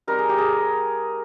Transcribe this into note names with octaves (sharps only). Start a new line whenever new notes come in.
G3 C4 D#4 A#4
G#4
G4
G#4